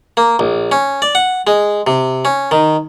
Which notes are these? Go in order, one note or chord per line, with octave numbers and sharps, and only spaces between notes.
A#3
A#1
C#4
D5
F#5
G#3
C3
C#4
D#3